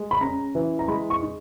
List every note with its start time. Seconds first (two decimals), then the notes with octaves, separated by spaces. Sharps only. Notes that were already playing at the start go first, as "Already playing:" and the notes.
Already playing: G#3
0.11 B5
0.21 C#4 A#5
0.55 E3
0.79 A#5
0.88 G#3 B5
1.10 C#6
1.21 D#4